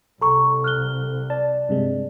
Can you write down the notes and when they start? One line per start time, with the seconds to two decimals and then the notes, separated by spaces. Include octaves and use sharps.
0.21 C2 A4 A#5 C#6
0.64 F6 F#6 G7
1.30 D5 A5
1.69 G2 C3 G#3